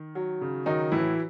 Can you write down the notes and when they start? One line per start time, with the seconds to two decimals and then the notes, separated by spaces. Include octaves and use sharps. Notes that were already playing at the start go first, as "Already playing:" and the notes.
Already playing: D#3
0.15 F#3
0.41 C#3
0.66 D#3 F#3 D#4
0.92 A2 E3 E4